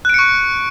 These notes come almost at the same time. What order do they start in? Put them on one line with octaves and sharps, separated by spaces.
F#6 D7 C#7 C#6